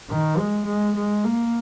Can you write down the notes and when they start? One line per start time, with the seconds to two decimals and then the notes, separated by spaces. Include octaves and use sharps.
0.10 D#3
0.38 G#3
0.66 G#3
0.96 G#3
1.24 A#3